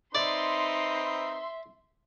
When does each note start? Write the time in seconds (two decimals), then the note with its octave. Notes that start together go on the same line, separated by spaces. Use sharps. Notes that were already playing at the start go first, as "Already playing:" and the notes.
0.15 C4 D#4 B4 D5 E5 C6